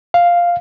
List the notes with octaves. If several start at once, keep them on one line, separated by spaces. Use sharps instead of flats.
F5